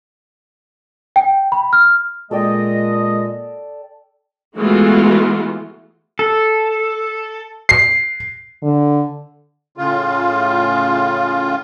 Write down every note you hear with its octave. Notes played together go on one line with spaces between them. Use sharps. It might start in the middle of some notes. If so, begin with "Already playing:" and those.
G5
B5
F6
A#2 G#3 A4 D5 D#5 G5
E3 G#3 A3 B3 F4 F#4
A4
C7
D3
A2 C#3 F4